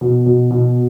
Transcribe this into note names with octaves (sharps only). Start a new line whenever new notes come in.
B2
B2
B2